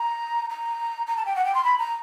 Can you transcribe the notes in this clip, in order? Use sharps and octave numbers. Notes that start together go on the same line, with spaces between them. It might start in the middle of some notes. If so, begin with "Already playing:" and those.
Already playing: A#5
A#5
A#5
A5
G5
F#5
G5
C6
B5
A#5